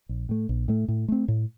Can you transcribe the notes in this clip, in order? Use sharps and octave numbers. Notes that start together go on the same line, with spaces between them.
A#1
A2 A3
A#1
A2 A3
A2
A3 C4
A2